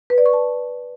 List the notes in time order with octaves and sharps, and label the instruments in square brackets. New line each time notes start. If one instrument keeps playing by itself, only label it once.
[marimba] B4
D5
C#6
A5